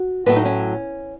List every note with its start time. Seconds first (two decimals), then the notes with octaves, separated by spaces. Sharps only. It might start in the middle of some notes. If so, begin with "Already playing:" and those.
Already playing: F#4
0.26 A2 F#3 A3 B3 B4
0.36 D#4
0.45 C#4